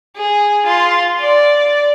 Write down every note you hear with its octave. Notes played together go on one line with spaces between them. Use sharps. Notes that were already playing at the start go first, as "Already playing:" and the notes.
G#4
F4 C6
D5